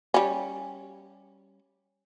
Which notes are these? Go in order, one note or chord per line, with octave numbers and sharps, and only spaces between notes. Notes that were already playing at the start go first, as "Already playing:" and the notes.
G3 C#4